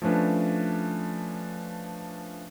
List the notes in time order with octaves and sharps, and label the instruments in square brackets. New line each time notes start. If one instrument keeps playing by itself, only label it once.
[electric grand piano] F3 A3 C#4 D4 B4